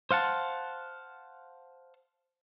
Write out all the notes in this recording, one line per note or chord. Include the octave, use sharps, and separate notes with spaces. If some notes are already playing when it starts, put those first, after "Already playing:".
C5 F5 F#5 A5